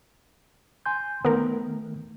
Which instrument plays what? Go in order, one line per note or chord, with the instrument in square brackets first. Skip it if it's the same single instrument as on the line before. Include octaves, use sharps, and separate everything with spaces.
[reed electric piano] G#5 C6 G6
[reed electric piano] D#3 A3 [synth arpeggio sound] B3 A#4